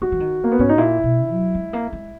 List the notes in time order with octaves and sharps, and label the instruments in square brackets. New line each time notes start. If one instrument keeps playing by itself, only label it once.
[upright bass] G#3 [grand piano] F#4
[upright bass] E3
D#3
[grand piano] A#3
B3
[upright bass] G#2 [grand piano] C#4
[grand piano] D#4
[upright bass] A#2 [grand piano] E4
[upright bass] B2
F#3
G#3
A#3
G#3